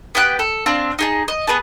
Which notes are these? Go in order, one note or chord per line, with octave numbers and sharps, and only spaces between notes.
B3 G4 G5 F#6
A4
C4 D4 F5 A5
D#4 G#4 A5
D#5
B3 G#4 B4 A5